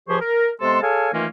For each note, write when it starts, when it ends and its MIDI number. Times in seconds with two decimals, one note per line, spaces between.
0.08 0.20 37
0.08 0.20 53
0.08 0.20 67
0.08 0.20 68
0.08 0.20 72
0.08 0.20 85
0.21 0.50 70
0.60 0.82 48
0.60 0.82 56
0.60 0.82 59
0.60 0.82 69
0.60 0.82 81
0.60 0.82 84
0.82 1.08 68
0.82 1.08 69
0.82 1.08 73
0.82 1.08 77
0.82 1.08 80
0.82 1.08 81
1.13 1.26 51
1.13 1.26 52
1.13 1.26 57
1.13 1.26 58
1.13 1.26 61
1.13 1.26 65